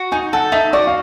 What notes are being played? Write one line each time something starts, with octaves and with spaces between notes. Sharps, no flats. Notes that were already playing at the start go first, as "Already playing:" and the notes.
Already playing: F#4
D#4 G#5
A4 F#5
D#4 E5
F#4 D5
F5